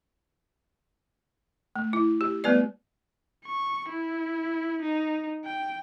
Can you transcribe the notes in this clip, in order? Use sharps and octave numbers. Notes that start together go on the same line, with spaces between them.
A3
E4
G4
G3 A3 B3 B4 D5
C#6
E4
D#4
G5